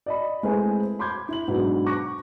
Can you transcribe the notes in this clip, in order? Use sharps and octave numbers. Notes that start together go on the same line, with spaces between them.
D5 D#5 B5
G#3 A3 C4 E4 B4 G#5
B5 C6 D6 G6 G#6
E4 F#7
G#2 B2 F#3 B3 D4
C#6 D6 F#6 A#6